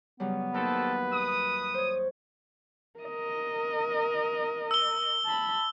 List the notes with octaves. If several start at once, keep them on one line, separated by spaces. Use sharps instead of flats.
C#3 F#3 G3 B3
D#2 C4 A4 B4
D#6
C5 C#5
A#4 D#5
E6 G7
A5 B5